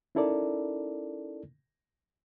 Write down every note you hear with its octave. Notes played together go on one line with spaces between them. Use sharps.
C#4 D#4 E4 A4 A#4 D5